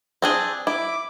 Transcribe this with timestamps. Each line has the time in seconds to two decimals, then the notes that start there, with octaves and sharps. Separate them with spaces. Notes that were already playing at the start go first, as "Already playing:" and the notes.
0.22 C4 D4 G#4
0.67 E4 D6